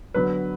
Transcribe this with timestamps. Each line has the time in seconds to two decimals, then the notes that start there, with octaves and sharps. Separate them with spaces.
0.14 D3 F#3 B3 B4